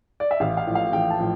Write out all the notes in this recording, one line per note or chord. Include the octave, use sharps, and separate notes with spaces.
D5
E5
A1 F5
F5
A2 F3
F5
A1 G5
A5
A2 F3